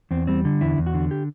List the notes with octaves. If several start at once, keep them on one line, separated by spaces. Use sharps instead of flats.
E2 C4
G3 C4
D3
E2 E4
E2
F#4
D3
G4